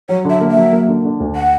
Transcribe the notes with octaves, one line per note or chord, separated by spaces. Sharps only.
F#3 C#5
D3 E5
A#3
E5
F#3
A#3
D3
D3
D2
F#5